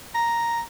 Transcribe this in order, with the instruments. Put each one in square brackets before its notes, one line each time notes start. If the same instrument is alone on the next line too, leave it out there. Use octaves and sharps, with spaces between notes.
[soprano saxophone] A#5